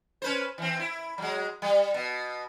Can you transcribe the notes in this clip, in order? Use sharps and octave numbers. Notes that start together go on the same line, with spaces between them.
C#4 B4 C5
E3 C4
E4
F#3 G#3
G3
B2